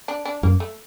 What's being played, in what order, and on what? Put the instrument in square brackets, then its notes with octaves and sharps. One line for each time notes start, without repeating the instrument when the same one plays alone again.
[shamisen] D4
D4
[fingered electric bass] F#2 [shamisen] A#3
[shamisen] A3